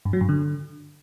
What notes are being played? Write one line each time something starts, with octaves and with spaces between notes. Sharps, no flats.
G2
F#3
G2
D3